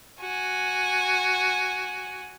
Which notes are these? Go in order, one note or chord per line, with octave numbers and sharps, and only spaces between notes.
F#4 G#5